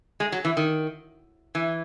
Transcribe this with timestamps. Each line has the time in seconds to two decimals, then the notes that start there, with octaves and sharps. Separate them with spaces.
0.20 G#3
0.32 F#3
0.45 E3
0.57 D#3
1.55 E3